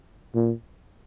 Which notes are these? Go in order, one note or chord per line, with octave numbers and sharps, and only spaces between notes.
A#2